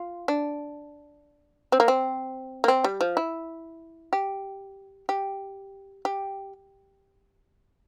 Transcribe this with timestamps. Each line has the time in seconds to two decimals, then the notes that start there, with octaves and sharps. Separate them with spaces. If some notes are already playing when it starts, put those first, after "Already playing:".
Already playing: F4
0.28 D4
1.72 C4
1.80 A#3
1.88 C4
2.64 A#3
2.68 C4
2.84 G3
3.01 F3
3.17 E4
4.13 G4
5.09 G4
6.05 G4